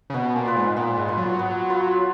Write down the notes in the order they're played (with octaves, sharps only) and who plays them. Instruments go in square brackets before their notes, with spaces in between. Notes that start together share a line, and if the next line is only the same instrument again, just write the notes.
[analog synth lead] C#3
[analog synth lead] B2 [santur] B3
[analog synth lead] A#2
[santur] F4 B4
[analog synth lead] G#2
[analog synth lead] A#2 [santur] B3
[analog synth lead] G#2
[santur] F4 B4
[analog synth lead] F#3
[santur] B3
F4 B4